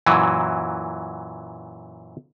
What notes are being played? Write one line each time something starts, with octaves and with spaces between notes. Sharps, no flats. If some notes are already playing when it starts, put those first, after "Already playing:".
F#2 A#2 E3 F#3